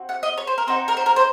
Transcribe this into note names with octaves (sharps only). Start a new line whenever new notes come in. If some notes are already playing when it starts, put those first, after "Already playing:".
Already playing: C4 F#4
F#5
D#5
C#5
C5
A#4
C4 D#4 F#4 C5
A#4
C5
A#4
C5